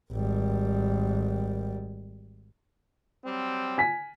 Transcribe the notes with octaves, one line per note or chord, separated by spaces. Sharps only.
G#1 G3
F#3 G3 C4
G#5 B6